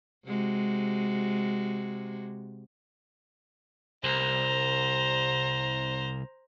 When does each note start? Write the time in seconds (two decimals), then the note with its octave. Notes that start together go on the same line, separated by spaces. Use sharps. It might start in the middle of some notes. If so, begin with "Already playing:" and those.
0.26 C3 G#3 F#4
4.04 C2 C5 A#5